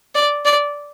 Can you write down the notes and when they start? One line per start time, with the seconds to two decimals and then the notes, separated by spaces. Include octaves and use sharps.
0.15 D5
0.45 D5